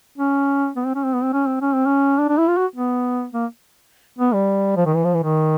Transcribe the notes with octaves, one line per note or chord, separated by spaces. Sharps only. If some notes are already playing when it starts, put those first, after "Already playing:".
C#4
B3
C4
C#4
C4
B3
C4
C#4
C4
C#4
C4
C#4
D4
D4
E4
F4
F#4
B3
A#3
B3
G3
F3
D#3
E3
F3
E3
D#3